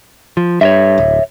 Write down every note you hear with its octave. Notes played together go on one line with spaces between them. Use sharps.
F3
G2 C#5 D#5 E5
D1